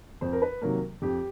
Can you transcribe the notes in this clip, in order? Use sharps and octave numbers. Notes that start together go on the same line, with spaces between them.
F2 C5
A#4
B4
C3 D#3 F#3 A#3 A#4
F2 G4